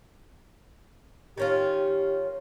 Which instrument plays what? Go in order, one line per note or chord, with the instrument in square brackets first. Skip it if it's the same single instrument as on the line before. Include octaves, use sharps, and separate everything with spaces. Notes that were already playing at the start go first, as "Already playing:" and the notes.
[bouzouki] D#3 C#4 F4 [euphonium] G4